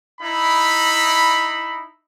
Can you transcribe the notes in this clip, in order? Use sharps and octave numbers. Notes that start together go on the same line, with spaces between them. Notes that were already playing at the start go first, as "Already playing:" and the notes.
D#4 E4 B5